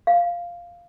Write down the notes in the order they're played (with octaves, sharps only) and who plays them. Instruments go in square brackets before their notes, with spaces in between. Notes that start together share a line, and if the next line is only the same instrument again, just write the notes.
[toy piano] F5